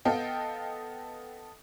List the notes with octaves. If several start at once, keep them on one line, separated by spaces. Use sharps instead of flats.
B3 A4 D#5 F5 G5